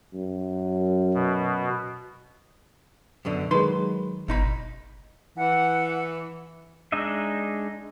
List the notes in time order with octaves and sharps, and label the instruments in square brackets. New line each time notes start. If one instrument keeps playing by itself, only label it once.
[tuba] F#2
[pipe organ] B2
[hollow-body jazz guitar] F#2 B2 D3
[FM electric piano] D#3 G#3 [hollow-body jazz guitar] F#3 B4 C6
[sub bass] G1 [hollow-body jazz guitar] B2 D#4 B5
[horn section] E3 [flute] F#5
[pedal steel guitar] G#3 D4 D#4 D#5 E5